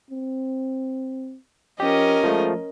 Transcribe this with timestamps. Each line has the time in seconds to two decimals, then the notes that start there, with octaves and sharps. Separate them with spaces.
0.11 C4
1.80 F3 C#4 G4 A#4 D#5
2.24 F3 G#3 A3